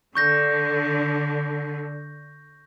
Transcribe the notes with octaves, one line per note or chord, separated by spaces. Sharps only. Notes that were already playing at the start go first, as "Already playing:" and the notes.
D3 C#6 G6 A#6